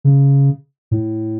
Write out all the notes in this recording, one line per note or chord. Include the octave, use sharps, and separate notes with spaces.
C#3
A2